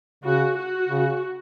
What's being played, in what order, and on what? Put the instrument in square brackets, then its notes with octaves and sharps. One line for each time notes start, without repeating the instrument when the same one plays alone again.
[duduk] C#3 [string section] F#4
[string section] F#4
[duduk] C#3